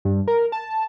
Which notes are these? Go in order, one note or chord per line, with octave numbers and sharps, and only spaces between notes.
G2
A#4
A5